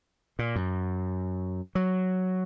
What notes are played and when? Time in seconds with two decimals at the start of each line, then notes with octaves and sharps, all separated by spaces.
0.39 A#2
0.56 F#2
1.75 F#3